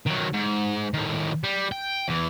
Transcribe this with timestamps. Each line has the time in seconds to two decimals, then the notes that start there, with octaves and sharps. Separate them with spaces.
0.06 D#3 F#3
0.33 G#2
0.94 A2 D#3
1.44 G3
1.72 G5
2.08 E2 E3